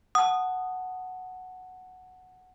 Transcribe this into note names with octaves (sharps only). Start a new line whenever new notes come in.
F#5 A5 D#6